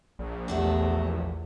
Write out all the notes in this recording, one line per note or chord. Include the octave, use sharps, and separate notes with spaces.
A#1
E2 A3 D4 F#4 G4